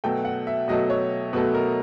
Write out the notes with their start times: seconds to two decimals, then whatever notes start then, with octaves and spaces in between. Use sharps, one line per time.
0.04 B2 F#3 A3 G5
0.25 F#5
0.47 E5
0.68 B2 F#3 A3 D#5
0.90 C#5
1.33 B2 F#3 A3 B4
1.54 A#4